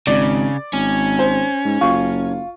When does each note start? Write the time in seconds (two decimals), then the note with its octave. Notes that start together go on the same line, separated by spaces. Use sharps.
0.07 G#1 C#3 D5
0.73 G#1 C#4
1.19 C5
1.65 G#2
1.81 F#1 F4 C#6